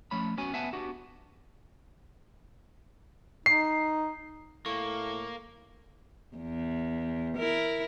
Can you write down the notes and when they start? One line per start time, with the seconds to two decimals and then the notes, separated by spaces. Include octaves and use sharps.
0.11 F3 A3 C#4 C#5 B5
0.37 B3 C#4 F#4 C#5 G#5
0.53 B3 B4 E5 F#5 G#5 A5
0.73 B3 D4 F#4 G4
3.46 D#4 C7
4.66 A2 A#3 C#6
6.36 E2
7.37 E4 A#4